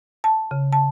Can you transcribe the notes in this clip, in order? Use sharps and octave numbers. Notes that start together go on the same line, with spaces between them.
A5
C#3
A5